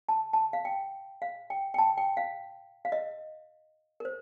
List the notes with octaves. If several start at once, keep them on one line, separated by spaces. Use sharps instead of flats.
A5
A5
F5
G5
F5
G5
G5
A5
G5
F5
F5
D#5
A#4
C5